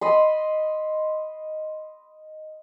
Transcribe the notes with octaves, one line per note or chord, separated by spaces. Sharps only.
D#5 B5 C6